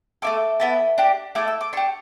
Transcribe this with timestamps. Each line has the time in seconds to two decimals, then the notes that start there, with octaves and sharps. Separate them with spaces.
0.22 A3 E4 A4 D6
0.60 B3 E4 A4
0.98 D4 G4
1.35 A3 E4 A4 D6
1.48 E6
1.61 D6
1.73 D4 G4 C#6